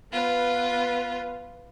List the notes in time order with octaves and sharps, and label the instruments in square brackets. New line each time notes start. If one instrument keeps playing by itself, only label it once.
[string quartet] B3 F4 B4